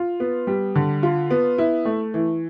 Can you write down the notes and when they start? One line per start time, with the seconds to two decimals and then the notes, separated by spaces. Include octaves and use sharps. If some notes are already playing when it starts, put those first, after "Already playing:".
Already playing: F4
0.20 B3
0.47 G3
0.75 D3
1.03 F4
1.31 B3
1.58 E4
1.85 A3
2.14 E3